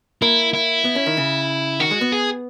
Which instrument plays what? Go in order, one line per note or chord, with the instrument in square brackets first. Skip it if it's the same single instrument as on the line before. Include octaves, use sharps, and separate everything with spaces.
[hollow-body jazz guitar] A#3 [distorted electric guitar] E4
[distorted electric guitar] E4
[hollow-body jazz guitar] B3
C#4
D#3
C#3
[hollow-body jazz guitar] D#3 [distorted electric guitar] F#4
[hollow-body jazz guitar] G#3
B3
[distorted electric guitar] G#4